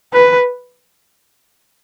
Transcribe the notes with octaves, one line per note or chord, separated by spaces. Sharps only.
B4